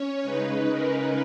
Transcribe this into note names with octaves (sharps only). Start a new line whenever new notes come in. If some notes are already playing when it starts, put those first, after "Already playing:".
Already playing: C#4 C#5
C#3 G#3 D#4 B4
A#4